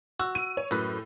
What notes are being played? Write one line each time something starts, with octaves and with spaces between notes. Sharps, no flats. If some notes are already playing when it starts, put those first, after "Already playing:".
F#4 E6
D#7
C#5
F#2 A2 B4